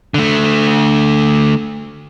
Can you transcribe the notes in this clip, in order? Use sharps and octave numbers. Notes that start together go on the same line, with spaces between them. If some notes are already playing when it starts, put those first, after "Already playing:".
D3 A3